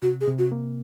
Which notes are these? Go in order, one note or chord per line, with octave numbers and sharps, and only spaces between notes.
C3 F#4
G#4
C3
F#4
A#3